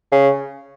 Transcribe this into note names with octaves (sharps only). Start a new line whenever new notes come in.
C#3